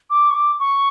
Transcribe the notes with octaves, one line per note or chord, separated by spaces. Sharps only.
D6
C#6
D6
C#6